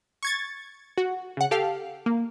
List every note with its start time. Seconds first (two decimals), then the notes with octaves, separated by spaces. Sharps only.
0.23 C#6 G#6 A6
0.98 F#4
1.37 C#3 F#5
1.51 G4 A4 F5
2.06 A#3